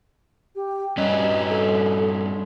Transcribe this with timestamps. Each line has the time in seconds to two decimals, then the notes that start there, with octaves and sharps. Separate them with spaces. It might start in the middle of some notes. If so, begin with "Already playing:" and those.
0.56 G4
0.97 G2 C#4 D#5
1.49 A4